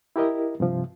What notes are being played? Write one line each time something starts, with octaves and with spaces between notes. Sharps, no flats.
E4 G4 A#4 D#5
G2 C3 F3